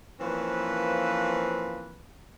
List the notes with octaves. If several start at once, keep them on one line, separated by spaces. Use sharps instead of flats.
E3 F3 A#3 C4 C#4 B4